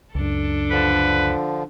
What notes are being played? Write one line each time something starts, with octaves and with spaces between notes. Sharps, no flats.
C#2 F#2 D4 A4
D3 F3 B4